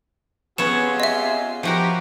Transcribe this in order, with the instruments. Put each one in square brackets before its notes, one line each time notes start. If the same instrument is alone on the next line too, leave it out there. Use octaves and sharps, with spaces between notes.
[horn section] C3 F4 G#4 [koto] B3 C#4 C#5 [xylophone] E7
[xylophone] D#5 E5
[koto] F3 F#4 A#4 [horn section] G4